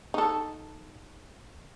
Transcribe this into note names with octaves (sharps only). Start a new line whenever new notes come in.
D#4 A4